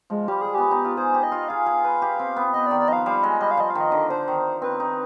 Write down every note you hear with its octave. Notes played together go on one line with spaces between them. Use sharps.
F3 G#3
G3 G4
G#3 G#4
B3 G4
D#4
F4
G#4 C5
G4
D#5
F4
G#4 F5
G#4
B4
G4
C4
B3
B3 D#5
D5
D#3
D5
F3 D#5
F5
G3 F5
G#3 D#5
G3 D#5
F5
F3 D#5
F5
D#3
D#5
D3
D3 C5
D#3
C4 B4
D#4